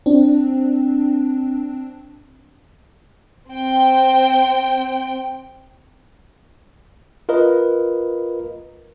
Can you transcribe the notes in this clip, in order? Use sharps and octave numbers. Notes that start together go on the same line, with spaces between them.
C4 D4
C4 G5
F4 A#4 B4 D#5